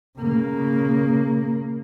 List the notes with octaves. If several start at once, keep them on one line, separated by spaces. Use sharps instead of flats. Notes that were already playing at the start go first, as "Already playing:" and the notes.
C#3 A#3